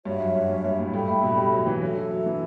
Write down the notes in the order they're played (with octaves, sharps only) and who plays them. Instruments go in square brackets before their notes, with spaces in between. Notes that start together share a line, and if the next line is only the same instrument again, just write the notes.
[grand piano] G2 [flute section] F#4 C#5 E5
[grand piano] F#2
G2
F#2
G2
A2
[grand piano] G2 [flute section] A4 E5 G5 B5
[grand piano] A2
B2
G3
F#3
E3
[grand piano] F#3 [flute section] D4 A4 E5
[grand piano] F#3
F#3
E3